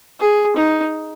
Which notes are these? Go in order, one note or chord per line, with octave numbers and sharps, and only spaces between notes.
G#4
D#4